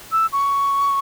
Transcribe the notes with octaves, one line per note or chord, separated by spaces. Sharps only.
E6
C#6